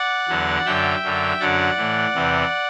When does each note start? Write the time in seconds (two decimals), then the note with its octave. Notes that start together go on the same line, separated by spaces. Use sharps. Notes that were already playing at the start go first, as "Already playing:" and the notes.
Already playing: D5 F#5
0.28 E2 D3 F#3
0.66 F#2 D3 F#3 E5 G5
1.03 F#2 D3 F#3
1.40 F#2 D3 F#3 D5 F#5
1.77 A2 E3
2.15 E2 C3 E3